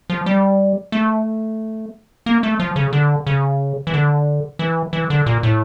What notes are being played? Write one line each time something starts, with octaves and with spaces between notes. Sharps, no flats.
F3
G3
A3
A#3
A3
F3
C#3
D3
C#3
E3
D3
E3
E3
D3
A#2
A2